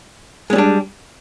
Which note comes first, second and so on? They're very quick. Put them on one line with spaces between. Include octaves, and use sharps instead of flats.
G#3 C#4 G3 D4